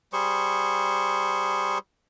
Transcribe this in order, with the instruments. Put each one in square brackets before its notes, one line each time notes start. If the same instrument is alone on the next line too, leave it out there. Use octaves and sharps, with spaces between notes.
[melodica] G3 G#4 C5 C#6